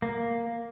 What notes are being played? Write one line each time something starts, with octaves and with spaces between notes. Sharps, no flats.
A#3